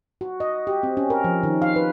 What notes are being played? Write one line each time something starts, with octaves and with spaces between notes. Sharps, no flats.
F#4
D#5
G4
C4
C#4
A#4
F3
D#3
F5
B4